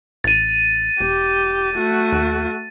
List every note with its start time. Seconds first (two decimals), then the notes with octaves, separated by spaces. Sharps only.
0.24 A1 A6 D#7
1.01 E1 G4
1.76 A3 F#4
2.12 D#2